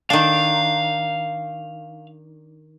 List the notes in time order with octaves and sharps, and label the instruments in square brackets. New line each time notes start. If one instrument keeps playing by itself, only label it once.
[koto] D#3 D4 [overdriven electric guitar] F5